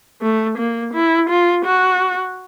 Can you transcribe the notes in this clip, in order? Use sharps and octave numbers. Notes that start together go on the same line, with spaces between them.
A3
A#3
E4
F4
F#4